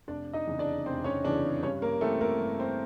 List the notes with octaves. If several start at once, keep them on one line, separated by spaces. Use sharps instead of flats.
F1 D4 D5
D#4 D#5
E2 C#3 E3
D4 D5
F1 C4 C5
C#4 C#5
E2 C#3 E3 D4 D5
G2 C#4 C#5
A#3 A#4
E3 A3 C4 A4
A#3 A#4
G2
C4 C5